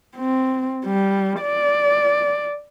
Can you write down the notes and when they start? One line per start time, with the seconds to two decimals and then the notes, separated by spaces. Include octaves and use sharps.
0.16 C4
0.86 G3
1.41 D5